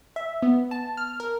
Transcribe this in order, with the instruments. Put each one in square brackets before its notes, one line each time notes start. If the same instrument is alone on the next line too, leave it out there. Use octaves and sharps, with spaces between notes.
[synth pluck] E5
B3
A5
F6
A#4